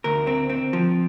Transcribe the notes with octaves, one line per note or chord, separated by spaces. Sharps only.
D2 A#4
C4
C4
F3